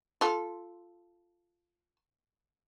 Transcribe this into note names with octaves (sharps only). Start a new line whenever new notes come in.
F4 A4